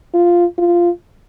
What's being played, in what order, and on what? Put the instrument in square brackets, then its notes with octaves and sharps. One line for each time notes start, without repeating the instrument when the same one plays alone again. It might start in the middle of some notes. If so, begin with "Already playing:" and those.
[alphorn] F4
F4